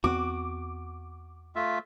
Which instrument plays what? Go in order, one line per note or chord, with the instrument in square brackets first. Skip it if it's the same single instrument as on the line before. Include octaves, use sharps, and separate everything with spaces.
[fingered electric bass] E2 B3 C4 [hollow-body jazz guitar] F#4 [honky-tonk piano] D6
[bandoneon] A3 F4 E5